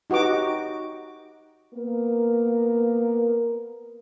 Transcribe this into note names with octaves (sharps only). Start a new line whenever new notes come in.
D#4 F#4 G4 B4 D6
A#3 B3 A#4